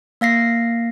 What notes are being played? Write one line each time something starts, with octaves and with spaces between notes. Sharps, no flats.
A#3 F5 A#6 C7